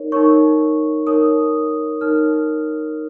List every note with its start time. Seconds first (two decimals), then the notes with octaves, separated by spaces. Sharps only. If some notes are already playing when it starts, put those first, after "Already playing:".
Already playing: D#4 A#4 C#5
0.12 D#4 A#4 C#5 C#6
1.07 D#4 A#4 C#5 D#6
2.01 D#4 A#4 C#5 F6